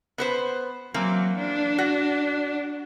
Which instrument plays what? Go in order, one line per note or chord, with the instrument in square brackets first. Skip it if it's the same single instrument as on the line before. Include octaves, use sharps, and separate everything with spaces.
[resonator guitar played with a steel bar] B3 B4 C5
[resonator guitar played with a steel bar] E3 A#3 C4 [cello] F#3
[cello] D4
[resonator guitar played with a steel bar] F#4